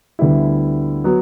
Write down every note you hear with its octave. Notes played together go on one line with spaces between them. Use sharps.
D2 D3 G3 B3 E4
F#3 B3 F#4